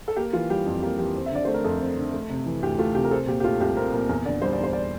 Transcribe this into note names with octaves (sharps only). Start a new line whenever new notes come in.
A4
A#3 G4
E3 F4
G3 G4
F2
A#3 G4
E3 G4
C4
E5
D3 D5
A3 C5
A#4
F2 A4
C4
D3
A3
C3
E3
D2 G4
A3 F4
C3 G4
A#4
C4 A4
A#2 G4
G4
A3 F4
C2 G4
C4 A#4
A#2 A#4
E2 A#4
D3 D5
G3 C5
D5
E2 C5
D5